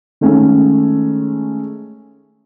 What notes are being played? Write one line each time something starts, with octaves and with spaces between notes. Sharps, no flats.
D#3 G#3 A3 C#4